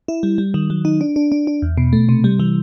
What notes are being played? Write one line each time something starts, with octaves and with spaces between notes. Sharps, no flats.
E4
G3
G3
D#3
F#3
D#4
D4
D4
D4
D4
E2
B2
A3
C3
G3
E3